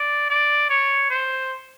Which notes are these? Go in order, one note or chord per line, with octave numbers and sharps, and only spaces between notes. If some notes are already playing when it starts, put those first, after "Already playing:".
Already playing: D5
D5
C#5
C5